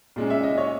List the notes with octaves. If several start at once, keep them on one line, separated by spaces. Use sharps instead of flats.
A#2 G#3 C#4
E5
D#5
C#5